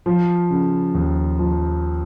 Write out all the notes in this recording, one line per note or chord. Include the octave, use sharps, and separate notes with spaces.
F3
C#3
D#2
F3